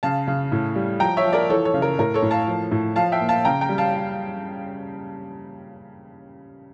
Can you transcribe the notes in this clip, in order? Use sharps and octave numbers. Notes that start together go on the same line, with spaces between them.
C#3 F5 A5
C#3
A2
G3
F3 G5 A#5
C#5 E5
F3
A#4 D5
E3 A4 C#5
A4 C#5
C#3
A#4
A2 A#4
A4 C#5
A2
F5 A5
F3
A2
F3 F5 A5
E5 G5
A#2
F5 A5
C#3 G5 A#5
G5 A#5
G3
F5 A5